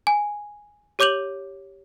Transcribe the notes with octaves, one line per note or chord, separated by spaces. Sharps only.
G#5
G4 C#5 D6 G6 F7 F#7